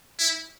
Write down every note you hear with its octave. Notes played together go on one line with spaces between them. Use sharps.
E4